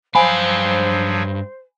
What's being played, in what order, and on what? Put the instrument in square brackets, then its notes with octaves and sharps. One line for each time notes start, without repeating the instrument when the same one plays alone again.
[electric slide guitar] G2 F5 [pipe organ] F3 F#3 [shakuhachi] C5 [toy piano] G#5 B5